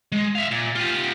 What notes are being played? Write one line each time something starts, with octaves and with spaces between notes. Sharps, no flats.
G#3
E5 F5
A#2
F4 G4